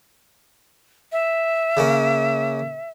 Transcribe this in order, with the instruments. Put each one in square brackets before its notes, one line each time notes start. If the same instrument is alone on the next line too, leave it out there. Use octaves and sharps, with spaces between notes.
[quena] E5
[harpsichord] C#3 A#3 C#4